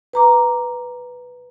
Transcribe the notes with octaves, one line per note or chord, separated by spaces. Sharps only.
B4 A#5 D6